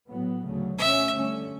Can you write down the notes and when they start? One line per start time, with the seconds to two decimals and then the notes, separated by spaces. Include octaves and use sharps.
0.10 A2 F#3 B3
0.45 D2 C#3 F#3 A3
0.78 B2 A3 C#4 E5
1.13 G2 D3 A3 C#4